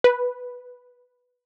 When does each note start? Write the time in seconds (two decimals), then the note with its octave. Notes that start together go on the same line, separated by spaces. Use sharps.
0.04 B4